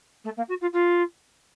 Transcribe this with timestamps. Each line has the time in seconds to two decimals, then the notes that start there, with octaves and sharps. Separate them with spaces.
0.24 A3
0.37 A#3
0.48 F#4
0.61 F4
0.73 F4